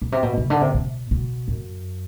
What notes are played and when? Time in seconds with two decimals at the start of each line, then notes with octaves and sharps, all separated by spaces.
0.02 B2
0.12 C3
0.23 B2
0.38 C3
0.50 D3
0.61 C3
0.75 B2
1.11 B2
1.48 F#2